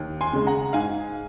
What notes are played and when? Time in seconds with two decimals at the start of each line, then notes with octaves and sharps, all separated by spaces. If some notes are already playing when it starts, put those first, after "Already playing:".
Already playing: D#2
0.21 G#5 C6
0.33 C#3 G#3
0.47 F#5 A#5
0.73 G#2 F5 G#5